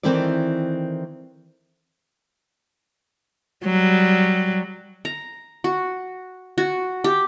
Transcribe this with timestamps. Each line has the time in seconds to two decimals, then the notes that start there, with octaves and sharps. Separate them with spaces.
0.03 D#3 E3 C4 E4 A4 D5
3.65 F#3 G3
5.05 A#5
5.64 F#4
6.58 F#4
7.04 G4